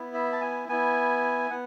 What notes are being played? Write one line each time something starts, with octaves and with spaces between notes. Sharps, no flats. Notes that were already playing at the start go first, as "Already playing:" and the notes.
Already playing: B3 E4
E5
A5
G#5
B3 E4 G#5
B3 F#5